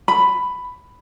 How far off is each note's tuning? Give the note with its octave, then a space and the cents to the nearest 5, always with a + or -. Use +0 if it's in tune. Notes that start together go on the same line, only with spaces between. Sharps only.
B5 +10